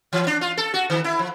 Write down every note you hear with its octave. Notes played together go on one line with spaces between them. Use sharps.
E3
D4
F4
A4
F#4
D#3
E4
F3